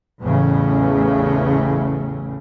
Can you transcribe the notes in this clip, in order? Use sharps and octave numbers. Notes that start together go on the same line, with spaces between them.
A1 E2 A2 C#3